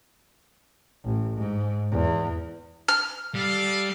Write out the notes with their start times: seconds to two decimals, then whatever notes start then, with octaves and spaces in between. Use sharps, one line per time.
1.05 A1
1.36 G#2
1.91 E2
2.88 F6
3.35 G3 A4 F5